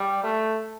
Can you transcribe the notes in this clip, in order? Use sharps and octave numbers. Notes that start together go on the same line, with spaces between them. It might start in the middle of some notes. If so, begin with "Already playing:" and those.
Already playing: G3
A3